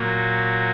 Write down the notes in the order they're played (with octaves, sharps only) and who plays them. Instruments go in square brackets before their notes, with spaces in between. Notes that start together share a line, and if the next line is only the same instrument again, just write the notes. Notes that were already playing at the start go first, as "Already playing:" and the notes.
Already playing: [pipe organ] A#2 F#3 A#3